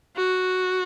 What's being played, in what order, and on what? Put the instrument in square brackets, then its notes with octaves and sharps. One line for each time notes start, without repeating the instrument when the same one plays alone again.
[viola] F#4